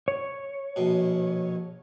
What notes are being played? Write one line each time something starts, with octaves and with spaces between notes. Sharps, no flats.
C#5
A#1 B2